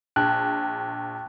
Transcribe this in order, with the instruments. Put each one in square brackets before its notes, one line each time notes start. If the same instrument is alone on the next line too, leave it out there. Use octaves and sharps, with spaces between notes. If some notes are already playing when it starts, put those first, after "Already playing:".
[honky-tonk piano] A#1 [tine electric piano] G5 A5 F#6